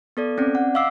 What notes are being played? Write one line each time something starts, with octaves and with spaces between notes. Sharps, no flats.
B3 A4 D5
C4 C#4 D5
F#5
D#5 F5 D6 E6 C7